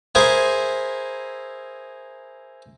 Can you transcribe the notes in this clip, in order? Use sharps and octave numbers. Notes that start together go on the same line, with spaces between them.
E4 G#4 A#4 C5 E5 G#5